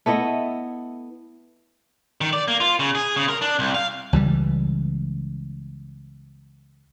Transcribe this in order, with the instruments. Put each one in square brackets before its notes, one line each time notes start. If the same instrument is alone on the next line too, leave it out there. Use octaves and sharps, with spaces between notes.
[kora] A3 B3 E4 D#5
[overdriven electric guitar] D#3
D5
A#3
F4
C#3
G#4
C#3
A#4
D4
C2
F5
[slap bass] C#2 E3 G3